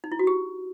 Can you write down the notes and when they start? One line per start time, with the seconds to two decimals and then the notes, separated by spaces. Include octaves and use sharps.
0.04 D#4
0.12 E4
0.19 F#4
0.27 G4